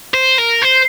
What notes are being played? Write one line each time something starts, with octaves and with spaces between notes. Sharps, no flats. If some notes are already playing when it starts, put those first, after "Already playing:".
C5
A#4
C5